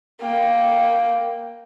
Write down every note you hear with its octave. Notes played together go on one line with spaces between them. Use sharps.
A#3 G5